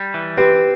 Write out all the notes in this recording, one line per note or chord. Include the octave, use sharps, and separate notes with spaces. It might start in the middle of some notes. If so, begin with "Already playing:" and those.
Already playing: G3
E3
C4 G4 B4